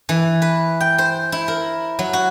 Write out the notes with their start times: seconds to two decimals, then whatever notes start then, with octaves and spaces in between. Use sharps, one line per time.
0.09 E3
0.42 B4
0.80 G5
0.98 C5
1.32 E4
1.48 A#4
1.99 F#3
2.13 F#4